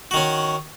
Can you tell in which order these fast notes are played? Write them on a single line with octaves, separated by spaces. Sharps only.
F#4 D#3 C#4